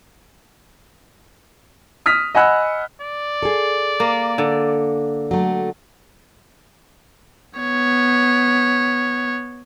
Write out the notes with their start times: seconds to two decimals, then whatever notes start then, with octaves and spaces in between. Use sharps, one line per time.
2.06 D#6 F6 B6
2.35 D#5 F#5 G#5 B5 E6 F#6
3.01 D5
3.43 G#4 A4
4.00 A#3
4.38 D3
5.31 F#3 A3
7.59 B3 C#5